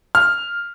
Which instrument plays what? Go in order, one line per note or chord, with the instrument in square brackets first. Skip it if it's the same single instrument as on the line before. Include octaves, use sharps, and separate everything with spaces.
[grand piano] F6